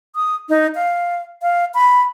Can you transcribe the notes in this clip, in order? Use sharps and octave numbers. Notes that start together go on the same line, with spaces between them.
D#6
D#4
F5
F5
B5